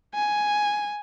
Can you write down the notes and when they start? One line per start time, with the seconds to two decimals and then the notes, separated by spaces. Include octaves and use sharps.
0.14 G#5